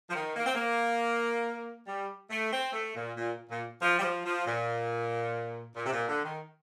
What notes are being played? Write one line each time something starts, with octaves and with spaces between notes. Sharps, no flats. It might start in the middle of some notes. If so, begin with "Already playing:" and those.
F3
D#3
A#3
C4
A#3
G3
A3
C4
A3
A#2
A#2
A#2
F3
G3
F3
F3
A#2
A#2
C3
A#2
D3
D#3